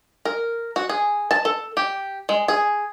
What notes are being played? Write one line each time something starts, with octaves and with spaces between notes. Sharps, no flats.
A#4
F#4
G#4
A5
A4
G4
G#3
G#4